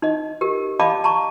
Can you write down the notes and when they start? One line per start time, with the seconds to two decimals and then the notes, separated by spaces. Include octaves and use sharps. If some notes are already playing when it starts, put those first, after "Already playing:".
0.02 D#4 D#5
0.41 G4 A#4
0.79 D5 D#5 F5 A5 B5 D6
1.04 A5 A#5 C#6